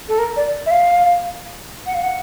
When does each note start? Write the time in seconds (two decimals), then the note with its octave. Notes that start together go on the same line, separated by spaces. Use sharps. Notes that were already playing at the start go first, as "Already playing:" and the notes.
0.09 A4
0.19 A#4
0.36 D5
0.66 E5
0.71 F5
1.86 F#5
1.94 F5
2.03 F#5